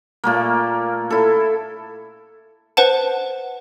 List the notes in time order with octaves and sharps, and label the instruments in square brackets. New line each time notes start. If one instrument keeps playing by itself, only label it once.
[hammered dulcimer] A#2 A3 A#3
E4 A4
[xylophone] B4 C5 F#5 A5